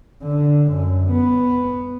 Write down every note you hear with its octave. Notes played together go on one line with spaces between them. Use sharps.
D3
F#2
B3